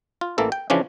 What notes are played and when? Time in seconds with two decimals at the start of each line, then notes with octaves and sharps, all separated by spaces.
0.21 F4
0.38 A1 E3 A#3 A4
0.52 G5
0.70 C#3 E3 F3 C#4 D4